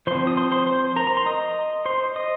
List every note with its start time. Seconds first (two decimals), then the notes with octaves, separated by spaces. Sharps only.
0.07 F3 C4 C5 C6
0.27 D#6
0.37 C5 C6
0.51 C5 C6
0.67 C5 C6
0.96 A#4 A#5
1.07 A#5
1.17 C6
1.26 D#5 D#6
1.86 C5 C6
2.16 D#5 D#6